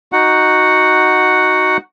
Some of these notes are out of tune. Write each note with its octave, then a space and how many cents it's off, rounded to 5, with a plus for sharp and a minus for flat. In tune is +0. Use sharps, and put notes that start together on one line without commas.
D#4 +0 F#4 +0 F#5 +0